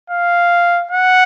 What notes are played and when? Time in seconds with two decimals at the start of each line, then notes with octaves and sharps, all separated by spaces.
0.10 F5
0.92 F#5